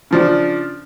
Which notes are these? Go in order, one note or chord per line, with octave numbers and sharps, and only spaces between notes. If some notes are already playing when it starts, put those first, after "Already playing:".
C#3 F3 D4